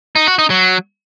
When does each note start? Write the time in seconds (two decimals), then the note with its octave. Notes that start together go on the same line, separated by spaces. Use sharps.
0.16 D#4
0.27 F#4
0.39 D#4
0.50 F#3